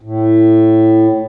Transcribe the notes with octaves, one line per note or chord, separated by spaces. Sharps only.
A2